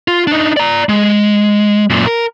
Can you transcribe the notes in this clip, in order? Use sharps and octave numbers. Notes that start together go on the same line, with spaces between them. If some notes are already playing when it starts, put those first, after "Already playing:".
F4
D4 D#4
D5 A#5
G#3
F#2 A#2
A#4